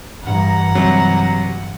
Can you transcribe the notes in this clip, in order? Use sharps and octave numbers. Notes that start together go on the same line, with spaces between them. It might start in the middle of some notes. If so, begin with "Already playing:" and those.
G2 E3 F#5 A#5
G2 C3 F#3